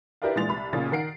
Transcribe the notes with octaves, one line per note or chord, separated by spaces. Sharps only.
E4 G4 A#4 B4 D5 F5
A#2 E3 G#3 D4 A6 F7
C2 B5
B1 A#2 C#3 A6
D#3 A#4 F#5 C7 D7